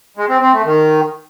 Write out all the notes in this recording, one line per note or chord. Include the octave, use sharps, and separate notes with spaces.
G#3
C4
C4
A3
D#3